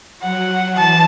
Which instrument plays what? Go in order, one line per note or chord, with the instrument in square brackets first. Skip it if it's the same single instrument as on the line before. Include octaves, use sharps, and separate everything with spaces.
[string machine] F#3 [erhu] F#5
[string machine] E3 [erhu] A5